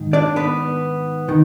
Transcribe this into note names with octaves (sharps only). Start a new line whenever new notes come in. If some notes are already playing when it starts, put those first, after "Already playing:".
Already playing: G#2 D#3
D4 D5
B3 B4
D#3